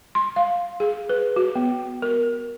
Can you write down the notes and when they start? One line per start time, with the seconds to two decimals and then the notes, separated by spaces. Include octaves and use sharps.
0.15 C6
0.36 F5
0.80 G#4
1.09 B4
1.36 F#4
1.55 B3
2.02 A#4